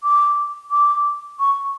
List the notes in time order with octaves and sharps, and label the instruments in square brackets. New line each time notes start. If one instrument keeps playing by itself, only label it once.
[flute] D6
D6
C#6